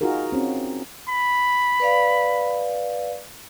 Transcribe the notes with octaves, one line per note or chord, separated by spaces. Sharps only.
D#4 F4 F#4 G#4 A#4
C4 C#4 F#4
B5
B4 D5 F5